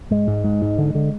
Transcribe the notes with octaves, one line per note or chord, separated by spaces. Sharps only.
G#2 G#3
G#2
G#2
G#2
D3
D3